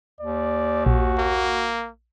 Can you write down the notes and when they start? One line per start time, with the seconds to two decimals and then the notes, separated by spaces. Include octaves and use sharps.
0.20 D#2 D5
0.86 A#1 F#4
1.18 A#3